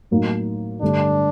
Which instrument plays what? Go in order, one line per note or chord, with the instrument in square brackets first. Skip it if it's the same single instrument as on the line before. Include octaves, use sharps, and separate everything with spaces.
[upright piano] A2 F#3 A#3 D#4
[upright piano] G2 D3 A3 [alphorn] D4